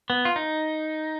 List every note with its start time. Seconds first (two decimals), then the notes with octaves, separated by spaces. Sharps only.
0.10 B3
0.25 F4
0.36 D#4